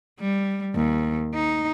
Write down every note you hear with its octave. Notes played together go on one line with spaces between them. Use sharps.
G3
D#2
D#4